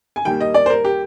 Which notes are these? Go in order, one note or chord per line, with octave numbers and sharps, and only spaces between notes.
G#5
D#2 D#3 G3 A#3 G5
D#5
D5
C5
A#4
G4